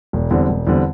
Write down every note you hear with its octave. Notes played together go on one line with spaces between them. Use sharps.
E1
E2 D3 G3 C4
E1
E2 D3 G3 C4